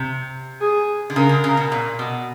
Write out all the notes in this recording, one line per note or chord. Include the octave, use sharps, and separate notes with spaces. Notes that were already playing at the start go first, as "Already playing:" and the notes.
Already playing: C3
G#4
D3
C#3 A#4
D3
C#3
B2
A#2
B2